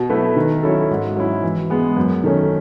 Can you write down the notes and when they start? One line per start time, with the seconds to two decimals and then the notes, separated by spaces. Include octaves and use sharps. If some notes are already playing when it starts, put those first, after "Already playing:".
Already playing: B2
0.09 F#3 A3 E4 B4
0.36 D#3
0.63 F#3 C#4 E4 A4
0.90 G#2
1.16 F#3 C#4 E4
1.43 E3
1.70 G#3 B3
1.97 F#2
2.23 D#3 A3 C#4